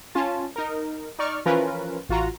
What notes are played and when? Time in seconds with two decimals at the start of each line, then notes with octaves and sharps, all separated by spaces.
0.15 C#4 F4 A5
0.56 D#4 A#4
1.19 D#4 D5 C#6 F6
1.46 E3 F3 C#4 F4 A#4 B4
2.09 A1 F4 F#4 A#5